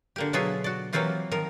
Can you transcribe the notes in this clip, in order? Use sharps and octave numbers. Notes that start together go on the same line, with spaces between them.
D3 A#3 G4
B2 F#3 F4 G#4 E5
F#4 D5
E3 F#3 A#3 C4 F4 G4
D#3 F3 A#4